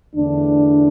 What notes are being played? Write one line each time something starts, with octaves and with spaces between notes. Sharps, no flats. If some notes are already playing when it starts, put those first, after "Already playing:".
E2 D3 A3 D4